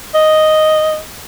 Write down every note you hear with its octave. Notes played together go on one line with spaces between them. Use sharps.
D#5